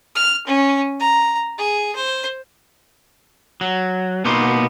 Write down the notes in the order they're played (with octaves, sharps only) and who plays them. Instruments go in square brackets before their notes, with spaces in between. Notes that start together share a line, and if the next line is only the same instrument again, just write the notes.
[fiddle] F6
C#4
A#5
G#4
C5
[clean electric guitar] F#3
B2 A#3 B3 D#4 C6